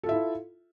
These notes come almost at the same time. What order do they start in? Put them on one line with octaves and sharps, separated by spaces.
A4 F4 E5 E4